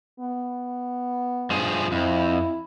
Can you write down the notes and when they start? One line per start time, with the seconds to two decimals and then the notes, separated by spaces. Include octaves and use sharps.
0.20 B3
1.50 G2 F3 G#4
1.92 F2 E4